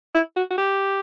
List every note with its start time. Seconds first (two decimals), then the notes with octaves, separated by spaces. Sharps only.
0.14 E4
0.36 F#4
0.50 F#4
0.58 G4